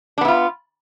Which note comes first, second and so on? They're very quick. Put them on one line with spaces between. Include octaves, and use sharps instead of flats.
D4 B3 E4 F4